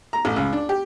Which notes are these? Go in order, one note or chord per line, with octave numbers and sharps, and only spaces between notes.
A#5
A1
C#2
D4
G4